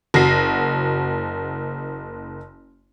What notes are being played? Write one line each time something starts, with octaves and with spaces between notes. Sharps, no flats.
F#1 F#4 A#6 C7